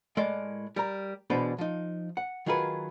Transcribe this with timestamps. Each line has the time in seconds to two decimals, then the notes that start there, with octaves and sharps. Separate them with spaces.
0.17 A2 G#3 A#4 D5 C6
0.76 G3 A#4 A#5
1.30 E2 B2 D4 B4 C5
1.58 F3 D#4
2.17 F#5
2.46 D#3 F#3 F4 G#4 A#4 B4